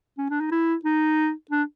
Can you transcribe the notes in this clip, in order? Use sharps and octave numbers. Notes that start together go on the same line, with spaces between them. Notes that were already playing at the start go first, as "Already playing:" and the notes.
C#4
D4
D#4
E4
D#4
D4